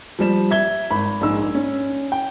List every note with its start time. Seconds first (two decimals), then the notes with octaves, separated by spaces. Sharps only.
0.19 F3 G3 E7
0.51 E5 G#6 G7
0.91 G#1 B5
1.21 A#1 G#2 E6
1.55 C#4
2.12 G5